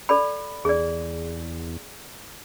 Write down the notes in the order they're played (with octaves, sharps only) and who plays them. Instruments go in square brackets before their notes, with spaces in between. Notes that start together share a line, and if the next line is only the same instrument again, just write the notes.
[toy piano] A4 D5 B5
[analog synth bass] E2 [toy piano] G#4 D5